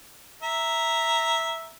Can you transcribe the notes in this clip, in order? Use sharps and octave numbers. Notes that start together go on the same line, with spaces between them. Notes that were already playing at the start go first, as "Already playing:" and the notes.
E5 A#5